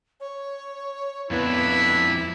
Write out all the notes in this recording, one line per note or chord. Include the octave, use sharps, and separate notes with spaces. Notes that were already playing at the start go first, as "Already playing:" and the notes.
C#5
F2 B3 D4 E4